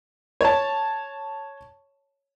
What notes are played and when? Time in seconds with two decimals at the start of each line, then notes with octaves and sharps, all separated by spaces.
0.41 C#5 A5